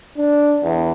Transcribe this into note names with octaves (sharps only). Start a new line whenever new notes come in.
D4
E2